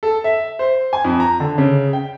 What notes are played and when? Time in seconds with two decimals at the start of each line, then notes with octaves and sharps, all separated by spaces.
0.03 A4
0.24 E5
0.59 C5
0.93 G#5
1.05 F2
1.20 A#5
1.40 D3
1.58 C#3
1.93 G5